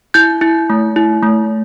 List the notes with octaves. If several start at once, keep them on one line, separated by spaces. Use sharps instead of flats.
E4 G6
E4
A3
E4
A3